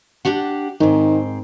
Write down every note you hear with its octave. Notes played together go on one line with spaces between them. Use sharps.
D4 G4 F#5
G#2 D#3 C4